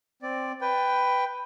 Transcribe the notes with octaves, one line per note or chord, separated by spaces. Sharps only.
C4 D5
B4 G5